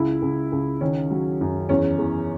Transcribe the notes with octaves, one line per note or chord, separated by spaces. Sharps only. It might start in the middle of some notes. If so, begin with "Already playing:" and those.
Already playing: C#2 E4
C#2
C#2
D#3 C#4
F#3
F#2
E2 C#4
E2